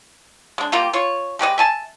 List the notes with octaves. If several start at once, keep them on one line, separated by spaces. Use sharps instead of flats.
G#3 D4
G3 A#3 F4 G4
F4 C#5
G#3 G4 B4 D#5
E5 G#5 A5